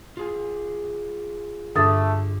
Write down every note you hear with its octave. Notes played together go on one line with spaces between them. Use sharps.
F4 G#4 G#5
G2 D3 A3 D#6 A6